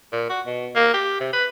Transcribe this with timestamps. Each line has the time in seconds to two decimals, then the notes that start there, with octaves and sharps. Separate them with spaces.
0.13 A#2
0.29 F#4
0.46 B2
0.75 A#3
0.94 G4
1.20 C3
1.33 B4